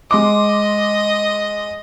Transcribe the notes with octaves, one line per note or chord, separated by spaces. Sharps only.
G#3 D#5 C6 D6